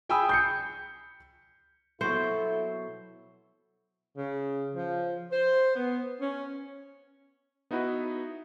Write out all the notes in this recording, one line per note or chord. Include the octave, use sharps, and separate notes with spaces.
G#4 G5 G#5 B5 D#6 E6
G6 C7 C#7
B2 F#3 B3 E4 A4 C5
C#3
F3
C5
B3
C#4
B3 D#4 E4 F#4 B4